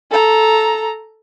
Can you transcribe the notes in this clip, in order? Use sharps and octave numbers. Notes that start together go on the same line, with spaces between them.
A4 A#5